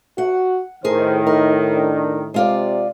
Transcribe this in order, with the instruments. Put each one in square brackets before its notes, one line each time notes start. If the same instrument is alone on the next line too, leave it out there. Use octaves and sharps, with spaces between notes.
[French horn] F#4 [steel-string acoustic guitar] F#5
[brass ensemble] A2 D#3 [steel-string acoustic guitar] G#4 A#4 [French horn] C5
[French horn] D#4 [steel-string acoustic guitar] A#4
[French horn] D4
[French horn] C3 [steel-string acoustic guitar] G#3 F4 D5